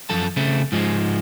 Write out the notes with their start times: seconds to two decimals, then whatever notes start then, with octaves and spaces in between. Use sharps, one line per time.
0.10 F#2 F3 A4 A5
0.37 C#3 A3 C4
0.72 G#2 F3 G#3